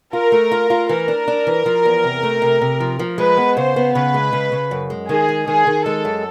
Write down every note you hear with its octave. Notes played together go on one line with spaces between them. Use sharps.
F4 A#4
A3
F4
F4
E3 A#4
D4
D4
E3
F3
E2
C3
A3
C3
C3
F3
F3
G#3 B4
B3
C#3 C5
B3
C#3 B4
G#3
C#3
C#3
F#2
G#3
D#3 G#4
G#3
D#3 G#4
D#3
G#3 A4
F#2